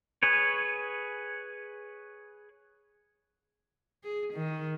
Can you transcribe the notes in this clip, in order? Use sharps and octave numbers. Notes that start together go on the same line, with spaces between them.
G#4 B4 C#5
G#4
D#3